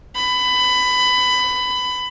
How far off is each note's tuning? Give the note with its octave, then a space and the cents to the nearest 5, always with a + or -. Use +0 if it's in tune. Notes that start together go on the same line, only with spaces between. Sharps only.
B5 +20